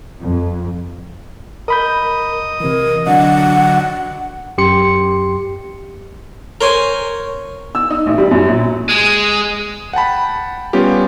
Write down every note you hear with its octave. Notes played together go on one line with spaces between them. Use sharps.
F2
A#4 D#5 B5 G6
C3 E3 A#4
D3 F#3 D4 D#5 F#5
F#2 G4 C6 C#7
A#4 C5 C#5 G#5
E6
D#4
A1
G3
F#2
A#1
G#3
F#5 G5 A5 B5
G3 B3 C#4 F4 G4